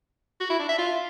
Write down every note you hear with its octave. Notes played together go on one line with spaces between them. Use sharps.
F#4
E4
D4
E5
F4